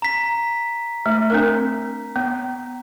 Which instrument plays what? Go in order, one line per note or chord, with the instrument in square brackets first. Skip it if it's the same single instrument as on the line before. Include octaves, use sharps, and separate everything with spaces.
[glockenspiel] A#5 B6
[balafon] A3
C4 D4 A#4
B3